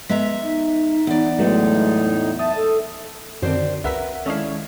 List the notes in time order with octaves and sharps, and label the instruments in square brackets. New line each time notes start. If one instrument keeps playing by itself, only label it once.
[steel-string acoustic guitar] G#3 E5 A#5 [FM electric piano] B3 B6
[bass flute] D#4
[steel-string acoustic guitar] E2 D5
[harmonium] A2 D#4 [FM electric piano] F#3 A3 B3 [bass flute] G#3
[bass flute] E5 [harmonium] A5 [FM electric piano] D#6
[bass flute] A4
[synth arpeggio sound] F#2 D#3 [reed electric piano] D3 F#4 [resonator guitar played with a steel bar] C4 D4 C5
[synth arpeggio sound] C#2 E6 B6 [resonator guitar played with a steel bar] A#4 B4 [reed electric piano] E5 F#5
[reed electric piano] D#3 G#3 [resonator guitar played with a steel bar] C#4 D4 E4 [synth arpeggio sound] A4 D#5 F5